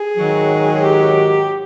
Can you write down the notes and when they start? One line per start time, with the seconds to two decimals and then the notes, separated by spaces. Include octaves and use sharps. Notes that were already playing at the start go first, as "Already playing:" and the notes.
Already playing: G#4
0.17 G#2 D#3 F#3
0.83 G4